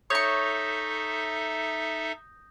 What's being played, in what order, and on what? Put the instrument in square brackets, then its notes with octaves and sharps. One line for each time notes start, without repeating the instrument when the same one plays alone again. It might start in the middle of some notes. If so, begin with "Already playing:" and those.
[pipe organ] D#4 A4 E5 [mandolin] C#5 C#6 [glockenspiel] D#6 G6 A#6